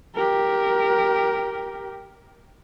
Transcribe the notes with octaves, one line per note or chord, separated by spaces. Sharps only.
G4 A#4